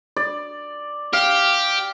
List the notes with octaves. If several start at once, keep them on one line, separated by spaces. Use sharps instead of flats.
D5
G4 F5